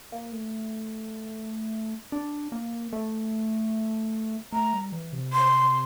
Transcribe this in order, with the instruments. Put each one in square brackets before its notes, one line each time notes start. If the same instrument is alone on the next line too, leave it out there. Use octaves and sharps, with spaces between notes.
[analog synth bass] A#3
A3
D4
A#3
A3
[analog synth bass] A3 [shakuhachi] A#5
[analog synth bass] G3
E3
C3
[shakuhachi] C6